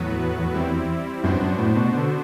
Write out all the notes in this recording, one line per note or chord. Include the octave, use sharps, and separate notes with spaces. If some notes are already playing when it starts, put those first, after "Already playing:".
Already playing: E2 A2 F#3 B3 F#4 B4
G3 C4 E4
F#2 B3 D4 F#4 C5
F#2
A2
B2
D3